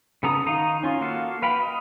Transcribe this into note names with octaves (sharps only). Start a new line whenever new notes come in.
C#3 B3 A4 A#5 D#6
D#3 D#4 F5 A#5 D#6
C#4 F4
A#3 F#4 A4 F5
B4 F5 G5 B5
D#5